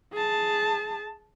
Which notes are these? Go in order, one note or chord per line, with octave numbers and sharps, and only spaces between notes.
G#4 A5